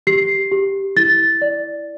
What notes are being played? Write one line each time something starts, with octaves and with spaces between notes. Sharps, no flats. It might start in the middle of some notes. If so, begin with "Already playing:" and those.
G4 C7
G4
E4 A6
D5